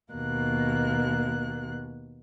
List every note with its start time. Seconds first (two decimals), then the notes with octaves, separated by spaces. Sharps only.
0.12 D#2 B2 A#3 F#6